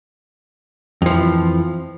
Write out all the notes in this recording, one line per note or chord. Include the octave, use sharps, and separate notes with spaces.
F2 E3 F3